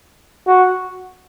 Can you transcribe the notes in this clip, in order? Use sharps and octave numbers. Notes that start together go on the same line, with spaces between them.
F#4